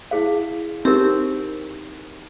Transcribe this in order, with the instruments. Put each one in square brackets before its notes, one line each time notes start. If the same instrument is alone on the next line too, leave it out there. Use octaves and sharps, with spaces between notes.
[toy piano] E4 G#4 F5
[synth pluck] C4 [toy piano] D#4 G4 A#4